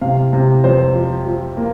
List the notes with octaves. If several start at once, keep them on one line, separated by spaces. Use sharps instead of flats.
C3 F5
C3
F2 C5
F3
F3
A#3